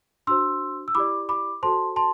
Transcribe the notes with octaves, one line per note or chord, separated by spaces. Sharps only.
D4 F#4 C5 C6 E6
E6
E4 G4 D5 B5 D6
B5 D6
F#4 A4 C5 A5 C6
A5 C6